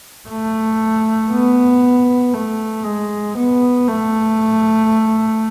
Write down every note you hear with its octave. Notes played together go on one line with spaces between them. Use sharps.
A3
B3
A3
G#3
B3
A3